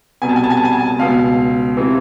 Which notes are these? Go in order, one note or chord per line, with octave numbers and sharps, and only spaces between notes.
C2 B2 G#5
A5
G#5
A5
G#5
A5
G#5
A5
G#5
C#2 B2 F5
C3 E3